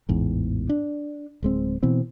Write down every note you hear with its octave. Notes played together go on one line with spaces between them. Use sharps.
A1 E2 G#2
D4
D1 G#3 C4
B2 E3 C4